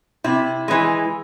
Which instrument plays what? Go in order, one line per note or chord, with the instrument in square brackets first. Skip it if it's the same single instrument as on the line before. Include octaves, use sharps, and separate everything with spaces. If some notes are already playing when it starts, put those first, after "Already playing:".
[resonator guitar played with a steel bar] C3 E4
E3 G#3